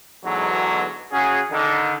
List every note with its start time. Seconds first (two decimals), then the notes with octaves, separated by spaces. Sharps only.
0.24 E2 G#2 B2 D3 E3 F#3
1.12 C#3 C#4 F#4 G#4
1.52 D3 D#3